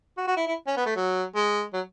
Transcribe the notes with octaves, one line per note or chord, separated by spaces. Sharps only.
F#4
F#4
E4
E4
C#4
B3
A3
F#3
G#3
F#3